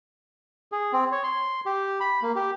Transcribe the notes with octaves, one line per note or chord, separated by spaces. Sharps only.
G#4
C4
C#5
C6
G4
B5
A#3
G4